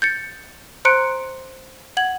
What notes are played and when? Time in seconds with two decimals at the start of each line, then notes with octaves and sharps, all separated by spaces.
0.02 G6 A6 C#7
0.85 C5 A#5 C6 F#6 C#7 D7
1.97 F#5 G#6 F#7